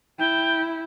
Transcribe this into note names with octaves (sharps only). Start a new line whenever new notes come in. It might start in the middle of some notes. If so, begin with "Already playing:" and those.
E4 G5